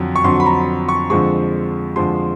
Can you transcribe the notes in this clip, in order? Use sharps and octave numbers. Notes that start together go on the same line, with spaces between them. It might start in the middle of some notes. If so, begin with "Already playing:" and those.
Already playing: F2 D3 F#3
C#6
F2 D3 F#3 C6
B5
A#5
C#6
F2 D3 F3 G#3 C#6
F2 D3 F3 G#3 C6